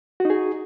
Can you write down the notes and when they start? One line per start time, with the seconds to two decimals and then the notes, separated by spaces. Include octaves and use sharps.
0.20 F#4
0.25 D#4
0.30 G#4